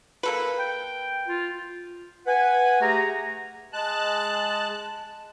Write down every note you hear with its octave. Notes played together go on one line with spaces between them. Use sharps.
A#3 A4 B4
G5
F4
B4 F#5 G#5
A3 G4 G#4 F#5 A#5
G#3 A5 F#6